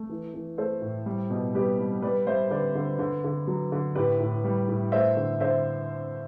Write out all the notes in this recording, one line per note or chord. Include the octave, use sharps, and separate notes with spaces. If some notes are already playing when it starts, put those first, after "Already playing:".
Already playing: A3
E3
E3
A3 A4 C5
A2
G3
B2
G3 G4 B4
G3
G3 B4 D5
G3 C5 E5
D3 B4 D5
D3
D3
D3
F#3
D3
A2 G4 B4
A2
G3
A2
A3 C5 E5
D3
D3 C5 E5